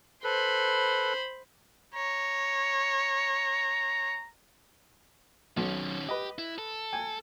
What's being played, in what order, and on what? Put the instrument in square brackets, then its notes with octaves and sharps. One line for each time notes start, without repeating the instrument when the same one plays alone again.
[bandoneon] A4 B4 [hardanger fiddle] C5 B5
[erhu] C#5 [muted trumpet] A#5
[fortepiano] B1 [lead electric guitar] D#3 C#4
[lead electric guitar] G4 [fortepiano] B4 D#5
[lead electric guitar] E4
A4
[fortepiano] G5 G#5